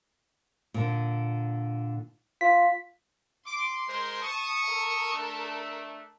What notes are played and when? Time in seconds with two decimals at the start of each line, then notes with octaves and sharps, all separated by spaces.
0.74 A#2 D3
2.41 F4 B6
3.46 C6 D6
3.88 G#3 A#4 C5
4.22 A5 C#6 D#6
4.67 A4 A#4
5.13 A3 D4